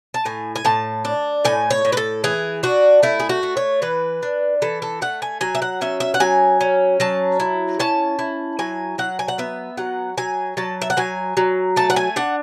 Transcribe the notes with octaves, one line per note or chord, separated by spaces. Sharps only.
A5
A2 G#5
G#5
A2 A5
D4
A2 G#5
C#5
A2
B4
A4
E3 G#4
D4 F#4
A3 E4
G#4
F#4
A3
C#5
E3 B4
D4
E3 A4
A4
A3 F#5
G#5
F#3 G#5
E5
F#5
C#4 E5
E5
F#5
F#3 G#5
C#4
F#3 A5
E4
C#4 A5
E4
F#3 G#5
F#3 F#5
G#5
F#5
B3 E5
F#3 F#5
F#3 G#5
F#3 A5
E5
F#5
F#3 G#5
F#3
A3 A5
F#5
G#5
D4 F#5